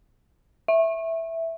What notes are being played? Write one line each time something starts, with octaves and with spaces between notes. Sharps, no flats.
E5